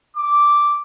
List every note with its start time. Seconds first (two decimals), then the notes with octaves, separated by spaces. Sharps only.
0.16 D6